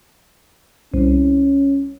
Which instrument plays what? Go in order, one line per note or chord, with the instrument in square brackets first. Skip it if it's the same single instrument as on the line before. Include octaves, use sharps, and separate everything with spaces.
[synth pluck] C2 [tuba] C#4